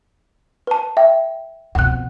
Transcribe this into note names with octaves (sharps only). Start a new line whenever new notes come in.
B4 A5
E5 G5
F2 B2 F#5 F#6